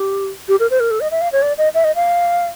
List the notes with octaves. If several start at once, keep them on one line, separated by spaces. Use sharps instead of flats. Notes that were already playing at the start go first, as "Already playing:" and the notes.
Already playing: G4
G4
A#4
C5
A#4
A4
D#5
E5
F5
C#5
D5
D#5
E5
D#5
F5